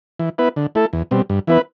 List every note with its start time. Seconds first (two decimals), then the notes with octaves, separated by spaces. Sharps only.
0.19 E3
0.38 B3 E4 B4
0.56 D3
0.75 A3 E4 A4
0.93 E2
1.11 B2 G3 C4
1.30 G2
1.47 E3 B3 E4 B4